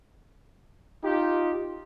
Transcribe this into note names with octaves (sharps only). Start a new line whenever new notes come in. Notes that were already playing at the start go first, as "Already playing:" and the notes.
D#4 F4 G4